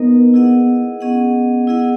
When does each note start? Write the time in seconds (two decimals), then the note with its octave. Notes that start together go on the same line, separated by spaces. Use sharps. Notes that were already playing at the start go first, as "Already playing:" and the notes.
Already playing: A#3 B3 D#4 A#4 D#5
0.34 E4 G#4 D#5 F#5
1.01 B3 C#4 G#4 D#5 F#5
1.67 E4 G#4 D#5 F#5